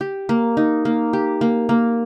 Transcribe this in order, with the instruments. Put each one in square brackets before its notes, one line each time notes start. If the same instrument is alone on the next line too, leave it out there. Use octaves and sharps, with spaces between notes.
[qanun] G4
A#3
D#4
A#3
G4
A#3
A#3